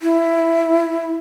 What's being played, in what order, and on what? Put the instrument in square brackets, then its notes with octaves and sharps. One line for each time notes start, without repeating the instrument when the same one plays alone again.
[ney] E4